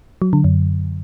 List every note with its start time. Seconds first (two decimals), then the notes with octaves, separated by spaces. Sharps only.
0.22 F#3
0.33 D3
0.44 F#2